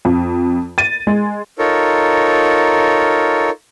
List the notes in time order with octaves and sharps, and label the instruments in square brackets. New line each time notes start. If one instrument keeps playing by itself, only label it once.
[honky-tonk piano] F2
A6 D#7
G#3
[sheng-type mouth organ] D#4 F4 A4 A#4 C#5